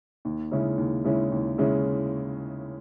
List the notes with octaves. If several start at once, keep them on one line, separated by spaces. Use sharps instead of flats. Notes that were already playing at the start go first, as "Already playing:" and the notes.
D#2
C#3 G#3 C#4 E4
D#2
C#3 G#3 C#4 E4
D#2
C#3 G#3 C#4 E4